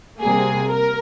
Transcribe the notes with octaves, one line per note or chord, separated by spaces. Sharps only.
C3 G3 A#3 G#4
A#4